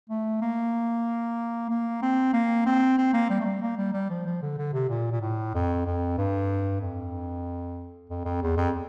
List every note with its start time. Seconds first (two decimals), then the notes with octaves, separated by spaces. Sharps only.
0.10 A3
0.42 A#3
1.70 A#3
2.02 C4
2.34 A#3
2.66 C4
2.98 C4
3.13 A#3
3.30 G3
3.41 A3
3.46 G3
3.62 A#3
3.78 G3
3.94 G3
4.10 F3
4.26 F3
4.42 D3
4.58 D3
4.73 C3
4.89 A#2
5.12 A#2
5.22 A2
5.54 F2
5.86 F2
6.18 G2
6.81 F2
8.10 F2
8.25 F2
8.42 E2
8.57 F2